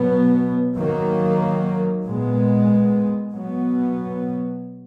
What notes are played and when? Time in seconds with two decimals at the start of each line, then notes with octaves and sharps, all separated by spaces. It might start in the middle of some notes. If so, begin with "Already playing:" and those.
Already playing: B2 F#3 B3
0.77 D#3 F#3 A#3
2.04 A#2 G#3 B3
3.32 B2 F#3 B3